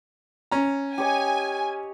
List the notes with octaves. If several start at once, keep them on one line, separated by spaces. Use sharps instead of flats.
C#4 A#5
G4 C#5 D#5 G#5